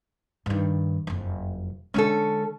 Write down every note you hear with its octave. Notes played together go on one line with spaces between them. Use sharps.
G2 D#3
F#1 F2
D3 G#3 C#4 A4